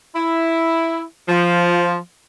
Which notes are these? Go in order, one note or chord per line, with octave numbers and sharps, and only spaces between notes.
E4
F3